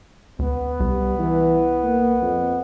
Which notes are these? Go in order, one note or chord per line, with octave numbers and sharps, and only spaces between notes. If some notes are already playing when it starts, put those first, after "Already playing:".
D2 B3
C2 G3
E3
A#3
F2